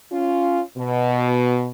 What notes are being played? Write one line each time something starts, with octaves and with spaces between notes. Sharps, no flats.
C#4 F4
B2